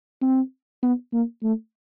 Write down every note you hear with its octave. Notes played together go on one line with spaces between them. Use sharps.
C4
B3
A#3
A3